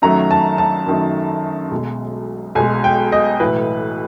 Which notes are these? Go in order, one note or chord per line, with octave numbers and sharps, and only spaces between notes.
F#2 D#3 F#3 A3 A#5
A5
A5
F#2 D#3 F#3 A3
B1 B2 G#3
B1 B2 G#3 G#5
G5
D#5
B1 A2 E3 B4